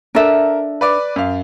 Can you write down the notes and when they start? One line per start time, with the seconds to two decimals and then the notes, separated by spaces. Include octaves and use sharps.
0.15 D4 A4 A#4 E5
0.81 B4 D5 D6
1.16 F#2 F5